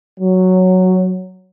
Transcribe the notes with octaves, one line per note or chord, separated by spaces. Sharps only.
F#3